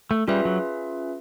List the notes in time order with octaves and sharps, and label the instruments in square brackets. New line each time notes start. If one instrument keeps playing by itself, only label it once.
[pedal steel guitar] A3
[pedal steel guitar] G3 [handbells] C#4 F4 G#4 B4 E5
[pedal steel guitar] F#3